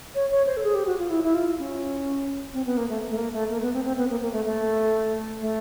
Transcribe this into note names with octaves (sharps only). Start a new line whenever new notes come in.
C#5
C#5
C5
A4
G#4
G4
F#4
F4
E4
E4
F4
C#4
C4
B3
A#3
A3
A3
A#3
A3
A#3
B3
C4
C4
B3
A#3
A#3
A3
A3
A3